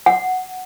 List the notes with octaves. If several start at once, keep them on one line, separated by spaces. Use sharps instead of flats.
F#5